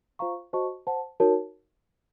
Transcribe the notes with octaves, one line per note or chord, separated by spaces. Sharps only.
F4 C5 F5 A#5 C#6
F#4 C5 D#5 A5 C#6
C5 F#5 A5
D#4 F#4 A#4 C#5 A5